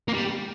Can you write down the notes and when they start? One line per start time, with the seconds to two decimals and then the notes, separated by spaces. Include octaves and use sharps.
0.08 A#3
0.14 G3